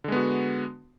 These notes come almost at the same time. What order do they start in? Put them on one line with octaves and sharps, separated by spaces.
D3 G#3 B3 F#4